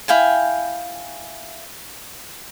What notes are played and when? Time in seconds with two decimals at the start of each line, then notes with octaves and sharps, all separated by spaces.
0.08 E4 F5 G5 G#5